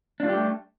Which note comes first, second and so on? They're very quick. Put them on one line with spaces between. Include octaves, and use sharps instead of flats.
D4 F4 G3 G4 A3